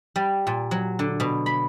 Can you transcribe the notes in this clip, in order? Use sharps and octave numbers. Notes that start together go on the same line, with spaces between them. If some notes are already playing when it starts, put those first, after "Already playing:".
G3
A#2
F#3
D3
B2
B5